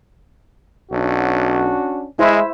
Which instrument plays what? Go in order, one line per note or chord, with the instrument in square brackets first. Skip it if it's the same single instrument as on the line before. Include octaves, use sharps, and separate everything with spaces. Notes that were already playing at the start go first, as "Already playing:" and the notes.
[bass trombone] B1 [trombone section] C#4 D4 F#4
[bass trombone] G#3 [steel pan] E4 C5 E5